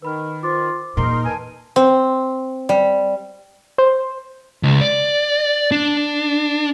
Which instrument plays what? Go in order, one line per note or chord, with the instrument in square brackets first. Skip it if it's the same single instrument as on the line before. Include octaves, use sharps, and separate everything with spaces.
[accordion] D#3 [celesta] B4 B5 F6
[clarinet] F4 [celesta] C5 D6
[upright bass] E2 A#2 [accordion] D#4 A#4 [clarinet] C6
[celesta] B4 A5 [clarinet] G#5
[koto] C4
G3
[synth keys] C5
[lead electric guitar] C#2
D5
D4